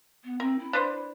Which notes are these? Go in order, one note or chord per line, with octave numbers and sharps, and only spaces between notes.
B3
C4 A#4
E4
D4 B4 C5